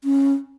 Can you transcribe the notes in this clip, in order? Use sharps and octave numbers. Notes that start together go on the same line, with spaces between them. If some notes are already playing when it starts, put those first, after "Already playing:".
C#4